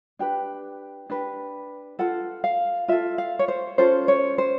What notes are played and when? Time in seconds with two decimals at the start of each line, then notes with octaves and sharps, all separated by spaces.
0.19 D4 G4 B4 G5
1.10 D4 G4 B4
1.99 F4 A4 F#5
2.44 F5
2.88 F4 A4 E5
3.18 F5
3.39 C#5
3.48 C5
3.78 C#4 F4 A4 C5
4.08 C#5
4.38 C5